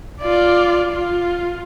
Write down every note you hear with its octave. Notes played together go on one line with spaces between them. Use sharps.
F4 D5
F4